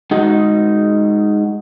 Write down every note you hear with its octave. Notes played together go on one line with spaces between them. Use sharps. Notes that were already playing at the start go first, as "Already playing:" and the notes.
G#3 D#4 F#4